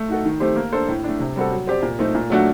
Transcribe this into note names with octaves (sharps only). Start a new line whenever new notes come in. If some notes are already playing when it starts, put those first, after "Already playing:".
Already playing: A3
D#4 F#4 A4
D#3
A3 C4 G4 C5
A#3
D4 A4 C5
A2
A3 D4
C3
G3 C4 F#4 A4
F#3
C4 G4 D5
A#2
A3 C4 D#4
A#2
F#3 A3 D4 F#4